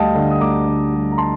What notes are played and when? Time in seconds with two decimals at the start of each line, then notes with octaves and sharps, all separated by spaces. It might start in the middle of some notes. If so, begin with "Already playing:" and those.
Already playing: D2 G3 D#5 F5 G5 A5
0.15 D3
0.30 D#6
0.40 D2 A#5 D6
0.66 D3
0.92 G3
1.12 A#5
1.18 A5 C6